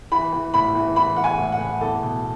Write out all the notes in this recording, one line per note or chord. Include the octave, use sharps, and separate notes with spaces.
E3 B5
E3
A2 B5
E3
E3 B5
E3 F#5
G#5
A2
F#5
A2
E2 A4
B2